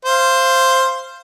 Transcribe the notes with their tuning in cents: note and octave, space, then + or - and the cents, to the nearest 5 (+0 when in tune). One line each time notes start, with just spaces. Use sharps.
C5 +5 F5 -20